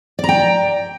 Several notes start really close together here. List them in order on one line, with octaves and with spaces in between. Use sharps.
D5 A#5 G5